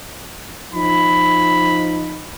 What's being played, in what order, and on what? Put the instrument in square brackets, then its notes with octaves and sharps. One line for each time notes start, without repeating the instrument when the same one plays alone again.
[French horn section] F3 D#4 [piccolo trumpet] B5